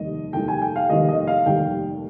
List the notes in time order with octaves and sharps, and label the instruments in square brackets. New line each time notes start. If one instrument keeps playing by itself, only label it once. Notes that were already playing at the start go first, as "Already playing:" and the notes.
Already playing: [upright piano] F1 D#2 D#3 G3 D#5
F1 D#2 D#3 G3 G5
G#5
G5
F5
F1 D#2 D#3 G3 D#5
D#5
F5
F1 D#2 D#3 G3 G5